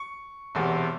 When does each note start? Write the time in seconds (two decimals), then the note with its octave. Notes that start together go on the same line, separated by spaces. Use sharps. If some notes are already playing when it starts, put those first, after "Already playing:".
Already playing: C#6
0.55 E1 E2 C3